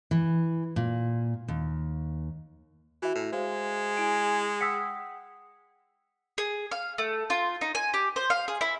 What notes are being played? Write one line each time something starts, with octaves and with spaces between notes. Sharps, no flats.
E3
A#2
D#2
E3 F#4 E5
A2
G#3 C5 F5
E4 G#5 D7
F#5 G5 D#6 E6 B6 C#7
G#4
F5
A3
F4
D#4
G#5
G4
C5
F5
G#4
E4